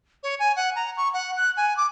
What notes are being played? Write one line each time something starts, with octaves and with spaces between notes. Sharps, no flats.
C#5
G#5
F#5
A#5
C#6
F#5
F#6
G#5
D6